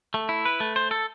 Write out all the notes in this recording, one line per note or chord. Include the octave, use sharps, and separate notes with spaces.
A3
E4
B4
A3
C5
A4